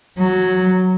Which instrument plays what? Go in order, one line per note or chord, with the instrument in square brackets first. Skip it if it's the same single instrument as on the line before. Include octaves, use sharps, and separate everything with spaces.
[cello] F#3